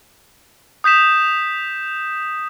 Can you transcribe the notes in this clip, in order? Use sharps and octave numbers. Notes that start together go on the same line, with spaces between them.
D#6 G6 B6 E7